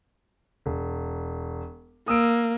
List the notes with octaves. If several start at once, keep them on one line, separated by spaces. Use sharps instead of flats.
E1
A#3 D#6 E6 D7